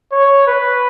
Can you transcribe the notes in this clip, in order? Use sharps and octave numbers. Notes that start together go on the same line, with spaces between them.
C#5
B4